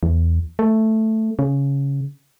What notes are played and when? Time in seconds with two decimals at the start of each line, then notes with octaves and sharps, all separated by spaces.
0.03 E2
0.59 A3
1.39 C#3